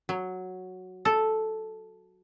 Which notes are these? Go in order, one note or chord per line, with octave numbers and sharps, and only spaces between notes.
F#3
A4